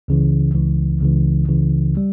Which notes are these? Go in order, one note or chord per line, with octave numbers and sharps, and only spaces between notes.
C#2 C#3 E3
C#2 C#3 E3
C#2 C#3 E3
C#2 C#3 E3
G3